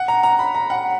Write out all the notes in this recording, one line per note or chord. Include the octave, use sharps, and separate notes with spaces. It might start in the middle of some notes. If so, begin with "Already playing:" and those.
Already playing: F#5
A#5
A#5
B5
A#5
F#5